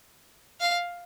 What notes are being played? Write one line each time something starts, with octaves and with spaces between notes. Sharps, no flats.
F5